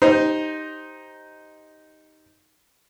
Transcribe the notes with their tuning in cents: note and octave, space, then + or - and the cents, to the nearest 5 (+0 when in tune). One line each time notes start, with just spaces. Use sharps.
D#4 +0 G4 +0 C5 +5